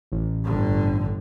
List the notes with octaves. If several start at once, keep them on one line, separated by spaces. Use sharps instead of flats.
A1
G1 D3